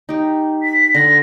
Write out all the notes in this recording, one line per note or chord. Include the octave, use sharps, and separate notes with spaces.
D#4 G4
B6
D3 F#5 C6 A#6